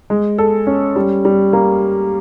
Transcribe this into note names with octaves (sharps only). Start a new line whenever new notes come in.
G#3
A4
C#4
G3
G3
A#3